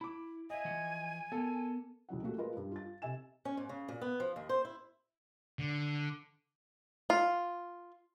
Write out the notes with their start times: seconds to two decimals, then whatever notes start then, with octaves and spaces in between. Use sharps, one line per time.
0.01 E4 B5 D6
0.50 D#5 E5 G#5
0.65 E3 F3 F#5
1.32 B3 A4 A#4
2.09 C#2 E3 F#3 F#5
2.23 A#2 A3 F#4 G4
2.38 G#3 F4 A#4 B4
2.57 G2
2.71 F4 A6
3.02 C3 E5 G#5 E7
3.45 C#4
3.57 G#2
3.69 C#3
3.88 A#2
4.01 B3
4.20 F3
4.36 D#2
4.49 C5
4.65 E4
5.59 D3
7.10 F4